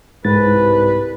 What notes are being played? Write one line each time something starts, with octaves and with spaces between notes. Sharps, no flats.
C2 G#2 B4 A6